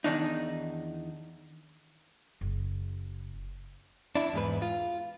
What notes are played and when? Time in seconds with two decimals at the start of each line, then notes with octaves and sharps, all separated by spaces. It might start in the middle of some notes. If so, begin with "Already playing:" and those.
0.04 E2 D#3 D4 D#4
2.41 F#1
4.15 D4 E4
4.33 E2 G#2 B4
4.62 F4